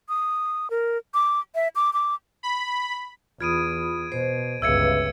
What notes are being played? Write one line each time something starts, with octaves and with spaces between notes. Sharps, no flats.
D#6
A#4
D6
E5
D6
D6
B5
E2 F4 B5 D#6 G#6 D7 D#7
B2 C5
G1 C#2 B4 E5 E6 G#6 C#7